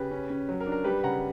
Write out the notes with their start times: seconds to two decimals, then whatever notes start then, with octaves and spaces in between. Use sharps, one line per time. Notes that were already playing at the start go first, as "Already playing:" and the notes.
Already playing: C#3 G4 B4
0.11 C#4
0.30 C#4
0.49 F#3
0.61 A#4
0.66 D4
0.72 A#4
0.84 G3 G4 B4
1.03 C#3 F#5 A#5